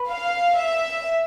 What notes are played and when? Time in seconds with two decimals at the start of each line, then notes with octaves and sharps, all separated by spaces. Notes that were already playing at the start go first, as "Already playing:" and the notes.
Already playing: B4
0.09 F5
0.56 E5